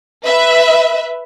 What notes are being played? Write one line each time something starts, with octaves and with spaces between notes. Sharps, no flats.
B4 E5